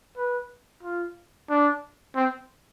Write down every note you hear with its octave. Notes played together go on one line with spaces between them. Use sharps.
B4
F4
D4
C4